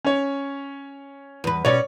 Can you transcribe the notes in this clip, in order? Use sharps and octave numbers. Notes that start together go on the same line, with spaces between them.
C#4 C#5
E2 B4
B2 C#4 C#5 D5